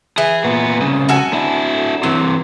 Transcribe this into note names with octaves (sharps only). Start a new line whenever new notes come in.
E3 G#4
A#2 B3
C2 C#3
F#4 A4 G#5
D4 E4
C3 E3 F#3